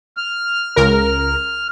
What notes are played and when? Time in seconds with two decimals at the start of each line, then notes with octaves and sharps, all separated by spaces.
0.17 F6
0.76 C#2 A#4